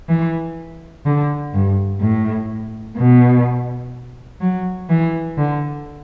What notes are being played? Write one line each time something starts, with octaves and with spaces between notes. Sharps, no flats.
E3
D3
G2
A2
B2
F#3
E3
D3